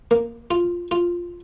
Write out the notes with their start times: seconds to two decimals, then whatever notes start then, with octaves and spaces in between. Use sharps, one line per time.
0.11 A#3
0.51 F4
0.91 F4